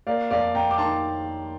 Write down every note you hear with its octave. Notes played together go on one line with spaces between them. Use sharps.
A#3 D5 F5
F2 D5 F5
F2 G5 A#5
D6
D#3 A5 C6